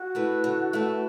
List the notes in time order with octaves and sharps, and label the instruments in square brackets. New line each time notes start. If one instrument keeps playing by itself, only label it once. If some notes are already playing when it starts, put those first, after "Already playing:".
Already playing: [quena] F#4
[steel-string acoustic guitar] A3 E4 B4
D3
A3 E4 B4